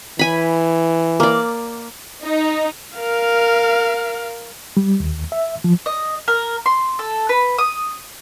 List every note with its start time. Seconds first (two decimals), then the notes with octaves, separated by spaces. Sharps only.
0.19 E3 G#5 B5
1.20 A#3 D5
2.23 D#4
2.97 A#4 F5
4.77 G3
5.00 D#2
5.32 E5
5.64 F3
5.86 D#5
6.28 A#4
6.66 C6
6.99 A4
7.29 B4
7.58 D#6